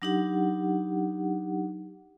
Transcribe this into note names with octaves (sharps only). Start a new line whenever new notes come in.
F#3 D4 D#4 G4 F#5